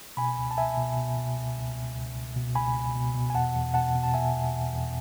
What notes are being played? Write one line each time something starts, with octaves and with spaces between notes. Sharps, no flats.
B2 G#5 B5
C#2
A5
C#2 E5 G#5
B2
B2
B2
C#2
C#2
C#2
C#2
C#2
B2
C#2 G#5 B5
C#2
B2
B2
G#5
E2 F#5 A5
E2
B2 F#5 A5
B2
A5
B2 E5 G#5
E2
E2
E2